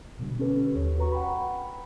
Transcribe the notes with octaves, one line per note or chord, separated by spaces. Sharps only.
B2 D3 G3
C#4 G4 A4 B4
D#2 C#5
F#4 B4 A#5 C#6
F#5 G5 B5